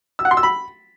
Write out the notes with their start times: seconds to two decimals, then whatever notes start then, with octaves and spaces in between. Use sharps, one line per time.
0.19 E6
0.25 F#5
0.31 C6
0.37 E6
0.43 B5